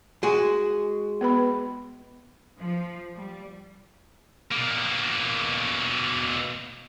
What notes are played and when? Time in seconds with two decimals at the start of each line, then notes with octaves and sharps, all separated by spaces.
0.23 G#3 F#4
1.21 B3 B4 B5
2.59 F3
3.15 G3
4.51 B2 A#3